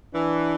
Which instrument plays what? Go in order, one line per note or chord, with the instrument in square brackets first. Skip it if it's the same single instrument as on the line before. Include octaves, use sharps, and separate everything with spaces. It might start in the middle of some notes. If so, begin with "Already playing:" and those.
[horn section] E3 [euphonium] D4